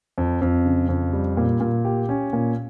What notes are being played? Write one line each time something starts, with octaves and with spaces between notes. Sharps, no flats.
F2
F2
C#3
F2
G3
A#2
A#2
G4
C#4
A#2